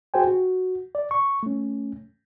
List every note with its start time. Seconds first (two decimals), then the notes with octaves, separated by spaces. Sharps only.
0.14 F#4 G#4 C5 G5 G#5
0.27 F#4
0.95 D5
1.11 C#6
1.43 A3 C#4